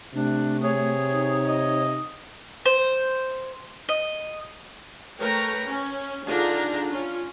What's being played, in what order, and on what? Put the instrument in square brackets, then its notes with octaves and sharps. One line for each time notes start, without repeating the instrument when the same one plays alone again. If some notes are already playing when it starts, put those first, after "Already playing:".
[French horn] C3 [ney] A3 [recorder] D4
[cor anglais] G#4 [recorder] C#5
[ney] D#4
[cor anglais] D#5
[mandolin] C5
D#5
[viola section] A3 A#4 B4 C#5 G5 A#5
C#4
D3 D4 D#4 F4 G#4 A#5
C#4 F4